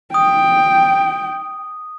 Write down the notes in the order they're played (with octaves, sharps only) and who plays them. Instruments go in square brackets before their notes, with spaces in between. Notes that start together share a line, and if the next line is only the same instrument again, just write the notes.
[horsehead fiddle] G5 [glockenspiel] D#6